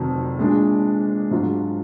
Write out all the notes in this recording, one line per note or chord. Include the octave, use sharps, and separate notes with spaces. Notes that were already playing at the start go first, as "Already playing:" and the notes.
Already playing: F1 F2 D#3 F#3
A#2 G#3 D4
G#2 F#3 D4 F4